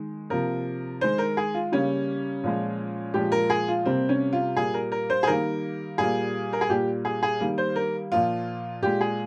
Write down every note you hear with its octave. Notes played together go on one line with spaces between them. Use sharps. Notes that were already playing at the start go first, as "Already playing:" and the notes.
Already playing: D#3 G#3
C3 F3 A#3 A#4
D#3 G#3 C5
A#4
G#4
F4
C#3 G3 A#3 C#4
A#2 F3 G#3
A#2 F3 G#3 G4
A#4
G#4
F4
C3 G3 A#3 C4
C#4
F4
A#2 G3 A#3 G#4
A#4
A#4
C5
G#4
D#3 G3 A#3 A#4
A#2 G3 A#3 G#4
A#4
G#4
A#2 G3 A#3 G4
G#4
G#4
D#3 G3 A#3
C5
A#4
A#2 F3 A#3 F4
A#2 G#3 G4
G#4